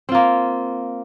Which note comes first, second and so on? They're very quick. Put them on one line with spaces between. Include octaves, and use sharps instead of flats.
C4 F4 A#3